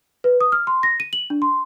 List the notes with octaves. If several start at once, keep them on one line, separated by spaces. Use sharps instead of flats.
B4
D#6
F6
C6
A#6
D#7
F#7
D4
C6